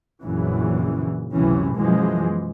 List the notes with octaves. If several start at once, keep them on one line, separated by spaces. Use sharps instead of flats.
A#1 F#2 C#3 E3
C#2 F#2 C3 E3 C#4
F#2 B2 E3 F3 G#3